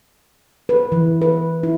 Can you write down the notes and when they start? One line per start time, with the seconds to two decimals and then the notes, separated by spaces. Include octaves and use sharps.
0.69 B4
0.92 E3
1.22 B4
1.63 E4